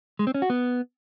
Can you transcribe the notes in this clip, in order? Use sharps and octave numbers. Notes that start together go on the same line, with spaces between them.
G#3
C4
C#4
F#4
B3